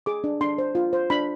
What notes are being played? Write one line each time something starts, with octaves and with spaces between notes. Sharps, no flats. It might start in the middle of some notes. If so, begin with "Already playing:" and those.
G#4 D6
D4
D4 C6
C5
F4
C5
D4 B5